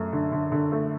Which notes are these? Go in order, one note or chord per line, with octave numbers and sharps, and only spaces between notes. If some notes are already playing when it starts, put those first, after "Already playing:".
Already playing: F#2 A3
D3
D3
D3
A3